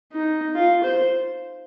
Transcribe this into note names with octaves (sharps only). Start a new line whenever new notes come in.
D#4
F4
C5